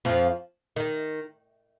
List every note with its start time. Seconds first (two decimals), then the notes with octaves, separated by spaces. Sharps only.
0.05 F2 F3
0.76 D#3